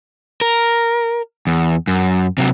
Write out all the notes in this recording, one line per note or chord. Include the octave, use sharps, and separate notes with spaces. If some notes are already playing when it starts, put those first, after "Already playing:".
A#4
E2
F#2
C3 F#3